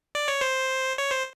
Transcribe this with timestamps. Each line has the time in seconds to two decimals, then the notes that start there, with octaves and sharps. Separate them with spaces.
0.15 D5
0.28 C#5
0.41 C5
0.98 C#5
1.11 C5